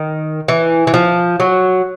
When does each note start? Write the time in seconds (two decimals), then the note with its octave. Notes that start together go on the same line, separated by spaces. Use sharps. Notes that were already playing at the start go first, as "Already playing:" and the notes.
Already playing: D#3
0.48 E3
0.87 E3
0.94 F3
1.40 F#3